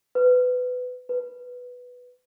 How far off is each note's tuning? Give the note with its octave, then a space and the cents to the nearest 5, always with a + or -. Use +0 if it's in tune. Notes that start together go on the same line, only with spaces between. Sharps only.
B4 +20
B4 +0